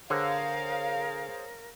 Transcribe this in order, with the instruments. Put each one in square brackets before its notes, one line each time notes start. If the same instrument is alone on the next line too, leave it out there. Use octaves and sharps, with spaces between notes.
[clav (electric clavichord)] D3 [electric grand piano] G#4 C5 C#5 [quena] A#4 [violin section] F5